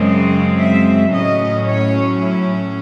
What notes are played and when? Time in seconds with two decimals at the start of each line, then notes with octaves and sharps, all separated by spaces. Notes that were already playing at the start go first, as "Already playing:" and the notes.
Already playing: F#2 C#3 G#3 C4
0.59 E5
1.12 A2 F#3 C#4 D#5
1.66 C#5
2.19 E4